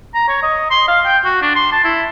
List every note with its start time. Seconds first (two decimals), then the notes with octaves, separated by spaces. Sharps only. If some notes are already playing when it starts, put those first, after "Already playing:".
0.14 A#5
0.28 C#5
0.43 D#5
0.71 C6
0.88 F5
1.05 G5
1.25 F#4
1.42 D4
1.56 C6
1.73 A5
1.84 E4